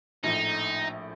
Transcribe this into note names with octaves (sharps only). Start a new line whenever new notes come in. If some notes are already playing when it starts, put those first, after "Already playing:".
A#1 A2 F3 D#4